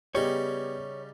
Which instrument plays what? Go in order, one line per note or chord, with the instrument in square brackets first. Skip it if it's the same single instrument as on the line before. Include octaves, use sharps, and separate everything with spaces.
[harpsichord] C#3 G3 D#4 [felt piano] B3 G4 [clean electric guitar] C#5